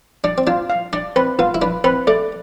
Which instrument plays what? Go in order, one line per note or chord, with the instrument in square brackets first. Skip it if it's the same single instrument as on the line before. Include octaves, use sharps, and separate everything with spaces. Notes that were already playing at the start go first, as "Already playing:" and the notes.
[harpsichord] D4 [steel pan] D5
[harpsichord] C4
[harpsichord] D4 [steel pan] F4
[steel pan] F5
[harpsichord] D4 [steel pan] D5
[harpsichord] C4 [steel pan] B4
[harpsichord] B3 [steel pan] F4
[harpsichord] E4
[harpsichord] D4 [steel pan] B4
[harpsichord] C4 [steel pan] B4
[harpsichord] A3 [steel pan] D5